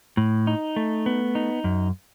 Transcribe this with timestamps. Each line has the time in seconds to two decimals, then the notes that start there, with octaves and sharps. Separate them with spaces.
0.17 A2
0.47 D#4
0.76 A3
1.06 B3
1.35 D#4
1.64 F#2